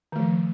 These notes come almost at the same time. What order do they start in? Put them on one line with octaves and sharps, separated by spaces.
D#3 A3 F3